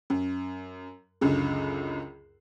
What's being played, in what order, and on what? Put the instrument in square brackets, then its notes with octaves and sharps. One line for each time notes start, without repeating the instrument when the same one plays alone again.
[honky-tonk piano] F#2
C#2 F#2 D3